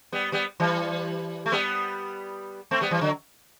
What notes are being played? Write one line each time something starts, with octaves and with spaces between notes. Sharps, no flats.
G3 B3
G3 B3
E3 G3
A3
G3 B3
A3 C4
G3 B3
E3 G3
D3 F#3